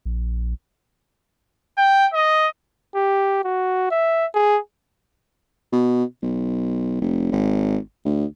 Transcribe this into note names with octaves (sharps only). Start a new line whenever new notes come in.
A#1
G5
D#5
G4
F#4
E5
G#4
B2
B1
F1
G#1
D2